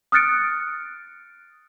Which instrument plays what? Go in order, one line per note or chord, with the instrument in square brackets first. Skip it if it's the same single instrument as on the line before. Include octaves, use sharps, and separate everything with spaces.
[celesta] D#6 F6 F#6 A6 C#7 D7